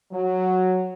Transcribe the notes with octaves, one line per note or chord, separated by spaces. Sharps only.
F#3